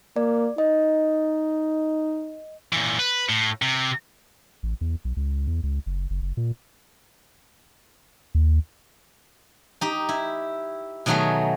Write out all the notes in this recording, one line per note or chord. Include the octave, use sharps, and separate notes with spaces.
A#3 D5
D#4 D#5
A#2 E3
B4
A2
C3
A1
E2
B1
C#2
E2
C#2
F#1
F#1
F#1
A#2
D#2
D#4 G4
E4
B2 D#3 F#3 A3 F#4 G#4